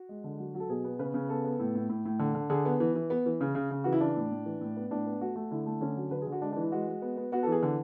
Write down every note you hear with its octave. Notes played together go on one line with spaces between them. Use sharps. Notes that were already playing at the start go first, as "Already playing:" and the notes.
Already playing: F#4
G#3
D3
F#3
F#3
A4
B2 G#4
B3
C#3 B4
C#3
B3 A4
B3
A2
A2
A2
A2
D3
D3
D3 G#4
B3
E3
E3
B3
E3
C#3
C#3
C#3
E3 F#4
E4
E3 D4
A2
A2
E3
A2
B3
A2 D4
B3
A3 F#4
A3 F#4
D3 E4
A3
D3 C#4
F#3
D3 B4
G#4
D3
F#4
G#3 D4
E3 D4
E4
G#3 F#4
G#3
B3
B3
B3 F#4
A4
E3
G#4
D3